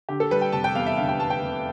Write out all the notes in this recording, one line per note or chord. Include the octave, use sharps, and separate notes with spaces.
D3 G4
A4
G3 B4
G5
F1 A5
G5
E2 F5
E5
D3 F5
G5
G3 A5
G5
F1